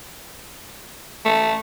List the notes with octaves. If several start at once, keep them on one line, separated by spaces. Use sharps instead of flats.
A3